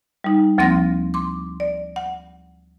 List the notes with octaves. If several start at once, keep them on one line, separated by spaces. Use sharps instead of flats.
G3 D#4
D2 F3 A#3 C4 C6 A#6
C6 D6
D5
F#5